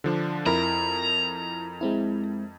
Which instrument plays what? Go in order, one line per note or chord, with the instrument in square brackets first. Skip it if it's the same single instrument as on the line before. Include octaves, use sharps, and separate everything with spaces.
[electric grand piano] D3 F3 D4
[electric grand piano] F2 A#4 B5 [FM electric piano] E4 [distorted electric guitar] A#5
[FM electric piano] G#3 C4 E4